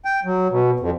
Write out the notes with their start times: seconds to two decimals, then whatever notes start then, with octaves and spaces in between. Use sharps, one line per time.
0.05 G5
0.25 F#3
0.51 B2
0.80 F2